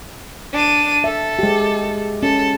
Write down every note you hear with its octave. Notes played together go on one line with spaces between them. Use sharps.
D4 D#7
A4 E5
G#3 G4
C#4 A4